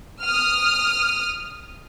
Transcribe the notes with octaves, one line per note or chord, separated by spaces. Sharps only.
D#6 F6